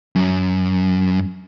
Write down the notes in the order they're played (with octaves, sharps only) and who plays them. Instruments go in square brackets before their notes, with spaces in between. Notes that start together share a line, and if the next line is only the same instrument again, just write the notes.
[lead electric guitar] F#2